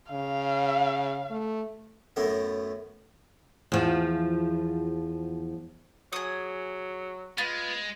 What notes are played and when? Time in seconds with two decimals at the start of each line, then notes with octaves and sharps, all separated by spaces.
0.12 C#3 F5
1.30 A3
2.16 F#2 A2 A3 B3
3.72 E2 F3
6.13 F#3 G#4 D#6
7.38 G#3 B3 F4 B4